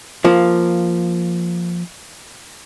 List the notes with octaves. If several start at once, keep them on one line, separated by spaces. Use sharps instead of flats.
F3 A#3